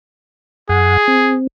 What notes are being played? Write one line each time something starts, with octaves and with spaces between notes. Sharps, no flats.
F#2 G#4 F#5
C4